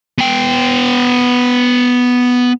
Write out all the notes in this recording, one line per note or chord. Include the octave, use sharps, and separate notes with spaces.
B3 G5